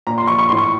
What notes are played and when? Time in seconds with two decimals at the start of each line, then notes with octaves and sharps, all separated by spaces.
0.07 A#2 A#5
0.18 C6
0.27 F3 C#6
0.39 C#6
0.49 A2 C6
0.58 C#6